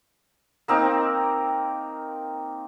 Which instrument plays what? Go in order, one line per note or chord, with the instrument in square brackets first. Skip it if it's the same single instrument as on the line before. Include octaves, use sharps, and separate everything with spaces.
[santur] A#3 C4 D#4 A#5